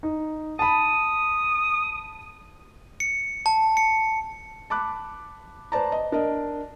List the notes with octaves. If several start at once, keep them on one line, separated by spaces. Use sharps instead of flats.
D#4
A5 B5 D#6
C#7
A5
C#7
A5 B5 D6 F#6
B4 C5 D5 A5 A#5
D#5
D4 A#4 D#5